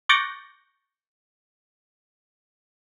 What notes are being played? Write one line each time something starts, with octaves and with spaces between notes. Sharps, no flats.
C#6 D6 F#6 G6 A6 A#6